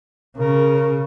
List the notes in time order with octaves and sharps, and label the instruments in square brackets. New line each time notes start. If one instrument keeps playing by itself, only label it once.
[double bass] C#3 [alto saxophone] A#4